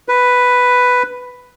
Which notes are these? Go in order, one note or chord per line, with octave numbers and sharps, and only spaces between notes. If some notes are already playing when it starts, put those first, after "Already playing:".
B4